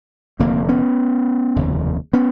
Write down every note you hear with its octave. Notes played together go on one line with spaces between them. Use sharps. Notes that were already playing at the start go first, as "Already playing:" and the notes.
F1 D#2 D3 A#3 C4
B3 C#4
F1 D#2 C#3
B3 C#4